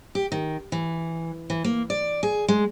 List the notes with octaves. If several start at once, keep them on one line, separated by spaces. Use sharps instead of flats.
G4
D#3
E3
E3
A#3
D5
G#4
G#3